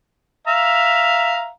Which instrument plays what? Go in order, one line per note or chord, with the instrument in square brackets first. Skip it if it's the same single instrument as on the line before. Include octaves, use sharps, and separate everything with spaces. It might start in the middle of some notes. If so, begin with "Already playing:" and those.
[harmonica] E5 F5 A#5